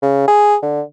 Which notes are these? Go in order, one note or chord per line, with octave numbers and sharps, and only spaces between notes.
C#3
G#4
D3